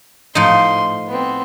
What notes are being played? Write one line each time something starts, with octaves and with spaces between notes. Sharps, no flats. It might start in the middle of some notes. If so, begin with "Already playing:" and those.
A2 F3 D#4 C6
B3 C4